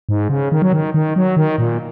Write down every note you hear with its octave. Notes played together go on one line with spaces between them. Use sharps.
G#2
C#3
D#3
F#3
D#3
D#3
F#3
D#3
A#2